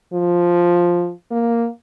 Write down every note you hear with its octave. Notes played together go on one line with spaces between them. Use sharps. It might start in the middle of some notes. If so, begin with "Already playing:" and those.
F3
A#3